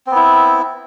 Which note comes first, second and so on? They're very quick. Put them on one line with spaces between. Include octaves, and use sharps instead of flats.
C4 B3 E4